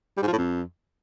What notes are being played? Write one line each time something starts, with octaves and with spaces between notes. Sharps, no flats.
G3
G#2
F3
A2
F2